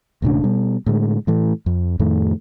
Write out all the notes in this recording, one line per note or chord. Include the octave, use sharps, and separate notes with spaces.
E1 A2 C#3 D4
B2 G3
A2 D3 G#3
A2 E3 A3
F2
F2 A2 D#3 A3